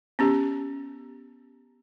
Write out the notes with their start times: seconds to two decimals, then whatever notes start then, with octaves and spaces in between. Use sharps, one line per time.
0.19 B3 C#4 G4